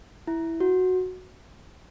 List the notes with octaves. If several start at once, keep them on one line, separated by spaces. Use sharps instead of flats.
E4
F#4